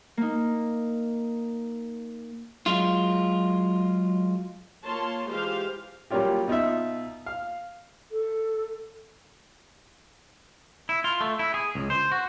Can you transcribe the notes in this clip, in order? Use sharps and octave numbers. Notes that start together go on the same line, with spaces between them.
A#3 D#4
F#3 G#3 F4
A#3 F4 C#5 A5 C6
E3 G#3 F4 G4 C5 F5
F#3 G3 A#3 C#4 F4 G4
B2 D#4 F4 E5
F5
A4
E4
F4
A3
E4
G#4
C#2
C5
F#4